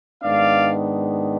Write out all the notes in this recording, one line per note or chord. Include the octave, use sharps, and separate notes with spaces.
G#2 D#3 B3 D4 D5 F5